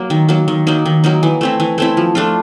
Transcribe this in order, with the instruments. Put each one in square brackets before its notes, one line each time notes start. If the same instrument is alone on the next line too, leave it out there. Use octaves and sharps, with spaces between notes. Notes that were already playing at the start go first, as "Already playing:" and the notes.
Already playing: [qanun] F#3 A#3
D#3
F#3 A#3
D#3
F#3 A#3 D#4
D#3
F#3 A#3 D#4
E3
A3 C4 E4
E3
A3 C4 E4
F3
A3 D4 F4